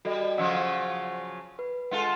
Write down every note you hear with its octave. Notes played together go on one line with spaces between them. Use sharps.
G3 F#4 A4 D#5
C#3 F3 F#3 D5 F#5 E6
B4
G#3 F4 A4 F#5